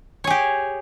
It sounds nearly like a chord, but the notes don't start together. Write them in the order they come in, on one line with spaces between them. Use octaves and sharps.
C#5 G#4 G4